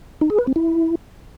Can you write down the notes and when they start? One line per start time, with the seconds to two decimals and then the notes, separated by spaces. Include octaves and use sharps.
0.21 D#4
0.30 G#4
0.39 B4
0.47 C4
0.56 E4